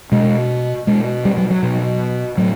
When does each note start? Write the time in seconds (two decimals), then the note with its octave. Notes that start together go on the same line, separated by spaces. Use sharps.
0.12 B2 G#3
0.87 B2 G#3
1.25 G3
1.37 F#3
1.50 F#3
1.62 B2
2.38 A2 F#3